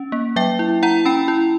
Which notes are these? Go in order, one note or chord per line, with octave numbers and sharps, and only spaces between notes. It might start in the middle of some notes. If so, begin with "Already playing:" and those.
Already playing: C#4
A#3
F#3 E5 G5
E4
E4 F#5 A#5
C#4 G5 B5
E4